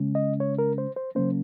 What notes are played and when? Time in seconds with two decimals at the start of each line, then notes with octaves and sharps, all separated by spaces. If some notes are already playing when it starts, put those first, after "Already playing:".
Already playing: C#3 G#3 C#4
0.15 D#5
0.40 C#5
0.58 A#4
0.78 C5
0.96 C5
1.15 C#3 F#3 A#3 C#4 C5